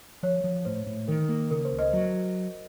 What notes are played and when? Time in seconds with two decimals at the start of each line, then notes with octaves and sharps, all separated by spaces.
0.23 F3 C#5
0.44 F3
0.65 A2 C5
0.86 A2
1.08 D#3 A#4
1.29 A#3
1.51 C#3 A#4
1.65 C5
1.72 C#2
1.79 C5 D#5
1.93 F#3